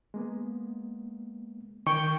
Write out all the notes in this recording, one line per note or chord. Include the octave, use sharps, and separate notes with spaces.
G#3 A#3 B3
D#3 G5 C#6